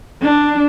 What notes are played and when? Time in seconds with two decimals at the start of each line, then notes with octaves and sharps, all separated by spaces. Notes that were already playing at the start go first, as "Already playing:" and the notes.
0.22 D4